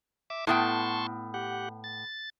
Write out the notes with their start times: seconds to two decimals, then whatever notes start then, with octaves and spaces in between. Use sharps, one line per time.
0.30 E5 D6
0.47 A2 B3 G5 A5 C6 C#6
1.34 G4 F#5
1.84 A6